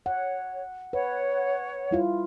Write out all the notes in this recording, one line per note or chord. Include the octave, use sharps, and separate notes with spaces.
C#5 F#5
B4 C#5 F#5
G3 E4 F4